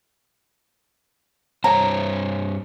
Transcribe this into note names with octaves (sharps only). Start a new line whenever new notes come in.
G2 C5 C#5 A#5